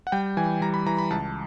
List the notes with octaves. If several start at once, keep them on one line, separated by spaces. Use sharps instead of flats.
F#5
G3 G5
E3 G#5
G3 A#5
B5
E3 A#5
B5
C#2 A5